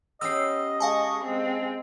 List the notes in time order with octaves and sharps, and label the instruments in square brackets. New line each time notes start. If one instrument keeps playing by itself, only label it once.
[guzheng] B3 C#4 G4 [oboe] D#5 [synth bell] E6 C7
[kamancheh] G#3 C#6 [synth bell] F5 G#5 A5
[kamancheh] G#3 C4